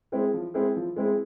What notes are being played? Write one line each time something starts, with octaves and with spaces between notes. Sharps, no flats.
G#3 C4 E4 G#4
F3
G#3 C4 E4 G#4
F3
G#3 C4 E4 G#4